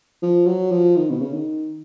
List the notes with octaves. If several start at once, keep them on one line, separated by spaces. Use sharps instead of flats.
F3
F#3
F3
D#3
B2
C#3
D#3